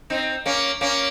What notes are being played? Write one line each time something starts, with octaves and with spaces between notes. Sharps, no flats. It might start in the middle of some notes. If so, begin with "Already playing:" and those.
C4 D#4
A#3 C#4
A#3 C#4